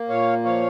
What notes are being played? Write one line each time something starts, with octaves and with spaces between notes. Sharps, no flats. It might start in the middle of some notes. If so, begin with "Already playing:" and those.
Already playing: A#3
A#2 C#5 F5
F3 C#5 F5